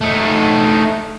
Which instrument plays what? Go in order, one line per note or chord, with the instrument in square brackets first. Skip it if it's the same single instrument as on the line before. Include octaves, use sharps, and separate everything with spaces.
[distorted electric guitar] A3 D#4